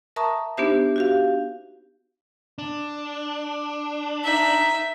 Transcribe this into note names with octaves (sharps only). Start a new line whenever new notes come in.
A#4 E5 A5 A#5 C#6 D#6
B3 D4 D#4 G4 C5 E5
F#4 G4 F5
D4
D#4 E5